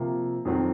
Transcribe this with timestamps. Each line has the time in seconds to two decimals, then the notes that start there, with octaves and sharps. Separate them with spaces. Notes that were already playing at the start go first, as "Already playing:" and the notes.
Already playing: C3 F3 A#3
0.45 F2 D#3 F#3 C4